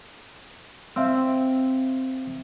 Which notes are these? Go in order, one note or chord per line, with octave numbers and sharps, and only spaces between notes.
C4 E5 F5 E6